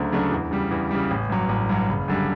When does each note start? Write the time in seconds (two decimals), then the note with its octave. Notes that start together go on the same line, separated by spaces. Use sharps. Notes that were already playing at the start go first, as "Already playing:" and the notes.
Already playing: D2 C#3 F#3 A3 D4
0.12 C#3 F#3 A3 D4
0.31 E2
0.51 C#3 G3
0.71 E2
0.91 C#3 G3
1.11 A1
1.29 G2 F#3
1.49 A1
1.69 G2 F#3
1.89 F#1
2.08 F#2 D3 G3